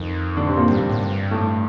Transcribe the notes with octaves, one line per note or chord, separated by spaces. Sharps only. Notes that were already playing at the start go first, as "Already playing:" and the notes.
Already playing: F2 D#3 D#4
D3 D4
C3 C4
A#2 A#3
G2 G3
A2
G2
A2 A3